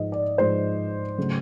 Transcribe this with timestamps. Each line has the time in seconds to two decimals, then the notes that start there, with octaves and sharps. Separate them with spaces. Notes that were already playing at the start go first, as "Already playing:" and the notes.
Already playing: G#2 F3 G#3 D#5
0.12 D5
0.38 G#2 F3 G#3 C5
1.18 C#3 F#3 A3